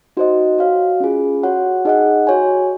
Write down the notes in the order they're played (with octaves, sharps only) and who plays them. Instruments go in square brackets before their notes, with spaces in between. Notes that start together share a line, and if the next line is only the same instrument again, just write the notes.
[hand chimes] D#4 F#4 C5 D#5
F#4 C#5 F5
C#4 F4 G#4
F#4 C#5 F#5
D#4 G#4 D#5 F#5
F#4 C#5 G#5